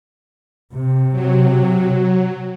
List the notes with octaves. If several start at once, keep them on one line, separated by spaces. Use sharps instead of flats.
C3
F#3